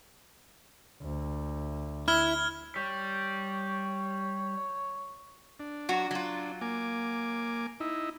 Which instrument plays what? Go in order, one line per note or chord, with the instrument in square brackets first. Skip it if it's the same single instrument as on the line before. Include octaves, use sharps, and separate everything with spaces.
[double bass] D2
[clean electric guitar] E4 [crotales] F6 G#6 G7
[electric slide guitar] G3 [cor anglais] C#5
[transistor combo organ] D4
[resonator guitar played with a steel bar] F#3 F#4
F#3 F4
[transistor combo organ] A#3 G#5 D6
D#4 E4